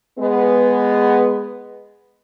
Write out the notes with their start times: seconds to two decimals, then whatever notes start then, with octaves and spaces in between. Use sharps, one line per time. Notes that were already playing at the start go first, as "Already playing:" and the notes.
0.18 G#3 B3